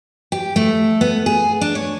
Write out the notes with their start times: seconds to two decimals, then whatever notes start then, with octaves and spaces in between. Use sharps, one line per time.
0.32 G4
0.56 A3
1.01 B3
1.26 G#4
1.61 D4
1.75 C#5